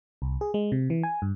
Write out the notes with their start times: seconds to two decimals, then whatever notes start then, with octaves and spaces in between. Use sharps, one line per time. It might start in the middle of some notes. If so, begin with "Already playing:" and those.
0.22 C2
0.41 G#4
0.54 G#3
0.72 C3
0.90 E3
1.03 G#5
1.22 G2